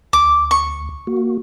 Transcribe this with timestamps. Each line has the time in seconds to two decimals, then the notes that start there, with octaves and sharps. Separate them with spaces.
0.13 D2 D6
0.51 C#6
1.07 A#3 F#4